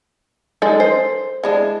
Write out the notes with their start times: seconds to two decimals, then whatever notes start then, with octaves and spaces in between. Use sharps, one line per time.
0.62 G#3 D#4 A4 D5
0.80 C5
1.44 E3 G#3 D4